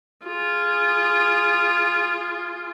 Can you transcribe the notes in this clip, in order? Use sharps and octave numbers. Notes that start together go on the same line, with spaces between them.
F4 G#4